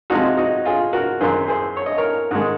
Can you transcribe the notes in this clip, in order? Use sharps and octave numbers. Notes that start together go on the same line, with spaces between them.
C3 F3 G#3 D#4 F#4
D#4 F#4
F4 G#4
F#4 A#4
F#2 D#3 F#3 G#4 C5
G#4 C5
C#5
D#5
A#4 C#5
G#2 D#3 G#3